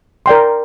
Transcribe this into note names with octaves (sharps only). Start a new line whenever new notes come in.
A#4 D5 G5 C6